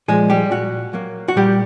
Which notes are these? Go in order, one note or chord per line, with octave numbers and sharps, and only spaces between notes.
A#2 F3 G#3 G#4
G3 G4
A#2 F#4
F#3 A#3
F#4
A#2 G3 G4